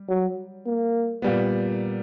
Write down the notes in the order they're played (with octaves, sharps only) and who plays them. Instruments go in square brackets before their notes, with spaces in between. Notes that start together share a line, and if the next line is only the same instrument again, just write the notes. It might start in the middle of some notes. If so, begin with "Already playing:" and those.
Already playing: [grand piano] G3
[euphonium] F#3
A#3
[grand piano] A#2 G3 B3